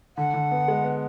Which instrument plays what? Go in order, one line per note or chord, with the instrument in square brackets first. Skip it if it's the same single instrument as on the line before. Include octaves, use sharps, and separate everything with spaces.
[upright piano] D3 [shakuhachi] F#5
[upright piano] D3
B3
G#3
B3